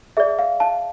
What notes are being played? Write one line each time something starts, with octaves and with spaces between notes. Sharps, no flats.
G#4 D5 E5
F5
F5 A5